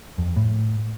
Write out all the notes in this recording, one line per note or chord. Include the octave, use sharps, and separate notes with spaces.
F2
A2